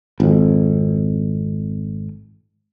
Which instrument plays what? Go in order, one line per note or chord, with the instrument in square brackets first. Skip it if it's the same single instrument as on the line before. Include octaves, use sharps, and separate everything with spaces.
[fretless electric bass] G#1 F2